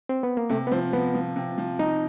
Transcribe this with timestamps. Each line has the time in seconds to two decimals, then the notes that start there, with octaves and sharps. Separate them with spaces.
0.09 C4
0.23 B3
0.37 A#3
0.50 C3 A3
0.67 B3
0.71 F3 C4
0.93 F3 B3
1.15 F3
1.36 C3
1.58 F3
1.79 F3 D#4